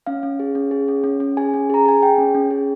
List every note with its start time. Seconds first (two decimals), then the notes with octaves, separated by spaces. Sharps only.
0.06 C#4 F5
0.23 C#4
0.40 G#4
0.55 C#4
0.71 G#4
0.88 C#4
1.04 C#4
1.20 C#4
1.37 G#4 G#5
1.54 C#4
1.70 G#4 A#5
1.86 G#4 G#5
2.02 G#4 G5
2.18 C#4
2.35 C#4
2.51 G#4